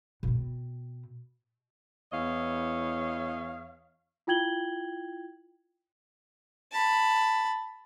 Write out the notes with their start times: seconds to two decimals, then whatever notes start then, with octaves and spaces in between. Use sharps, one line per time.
0.23 B2 C4
2.13 E2 E4 C#5 D#5 F5
4.27 E4 F4 G5 G#6 F#7 G7
6.72 A5 B5